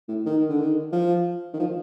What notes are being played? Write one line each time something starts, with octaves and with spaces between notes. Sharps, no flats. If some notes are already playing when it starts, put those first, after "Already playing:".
A2
D#3
D3
D#3
F3
D#3
F3